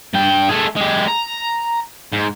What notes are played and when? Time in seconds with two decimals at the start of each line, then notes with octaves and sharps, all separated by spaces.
0.14 G2 G5
0.49 A3 G#4
0.77 G#3 G4
1.08 A#5
2.13 G#2